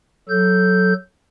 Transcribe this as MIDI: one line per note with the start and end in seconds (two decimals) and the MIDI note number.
0.29 0.93 54
0.29 0.93 69
0.29 0.93 91